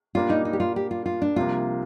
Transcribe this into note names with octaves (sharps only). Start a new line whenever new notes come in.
A#2 G3 A#3 D4 F4
D#4
D#4
G4
F4
G4
F4
F4
D4
C2 C3 F3 A#3 F4